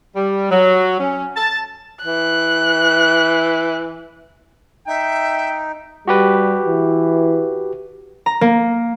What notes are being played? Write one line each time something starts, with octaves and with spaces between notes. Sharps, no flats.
G3
F#3
C#4
A5
E3 F#6
D#4 E5 G5
G3 F#4 G4 B4
E3
A#5
A#3